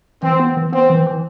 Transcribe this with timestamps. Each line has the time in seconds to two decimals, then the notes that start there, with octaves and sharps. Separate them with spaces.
0.23 E3 C4
0.40 B3
0.57 E3
0.73 B3 C4
0.90 E3
1.06 E3